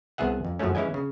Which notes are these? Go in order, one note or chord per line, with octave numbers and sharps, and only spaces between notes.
C2 B3 G#4 E5 F#5
F2
F#2 F3 F#3 G#3 A3 C#4
E3 G#3 C#4 E4 D#5 G#5
C#3